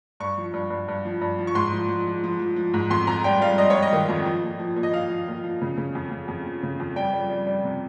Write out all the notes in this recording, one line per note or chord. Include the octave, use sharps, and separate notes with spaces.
G2 C#6
F3
G2
G2
G2
F3
G2
F3
C#6
G#2 C6
F3
F3
F3
F3
F3
F3
G#2
F2 C6
F2 A#5
G3 G5
G3 F5
G3 D#5
C#5
G3
D#5
D#3
F2
F3
A#2
F3
A#2
D#5
F3 F5
F3
A#2
F3
C#3
C#3
F2
F2
F2
F3
C#3
F2
G3 G5
G3
G3
G3
C3